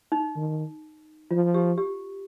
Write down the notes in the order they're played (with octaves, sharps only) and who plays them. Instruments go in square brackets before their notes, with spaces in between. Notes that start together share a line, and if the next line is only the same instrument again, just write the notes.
[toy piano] D#4
[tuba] D#3
[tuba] F3 [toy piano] F4
[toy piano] G4
G4